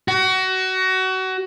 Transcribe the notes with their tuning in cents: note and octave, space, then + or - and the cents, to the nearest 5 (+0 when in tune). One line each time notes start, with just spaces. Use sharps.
F#4 +25